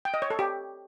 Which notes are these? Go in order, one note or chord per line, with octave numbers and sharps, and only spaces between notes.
G5
D#5
C#5
A4
G4